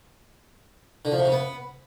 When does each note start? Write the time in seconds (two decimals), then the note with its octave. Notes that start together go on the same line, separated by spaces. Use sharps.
1.05 D3
1.12 F3
1.18 C3
1.25 C#3
1.32 B3